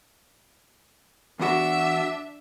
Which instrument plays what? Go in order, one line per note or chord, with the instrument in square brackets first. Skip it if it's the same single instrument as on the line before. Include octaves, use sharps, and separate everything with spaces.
[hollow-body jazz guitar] E2 F#4 [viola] D4 E5